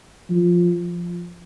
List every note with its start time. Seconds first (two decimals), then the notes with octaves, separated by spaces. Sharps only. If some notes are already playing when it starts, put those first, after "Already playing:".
0.30 F3